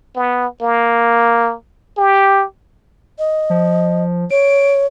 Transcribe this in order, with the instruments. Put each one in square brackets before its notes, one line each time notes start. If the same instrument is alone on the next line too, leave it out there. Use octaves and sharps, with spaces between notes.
[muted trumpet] B3
A#3
G4
[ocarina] D#5
[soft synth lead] F3
[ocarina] C#5 [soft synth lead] D7